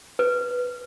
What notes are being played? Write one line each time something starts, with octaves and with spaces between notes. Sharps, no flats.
B4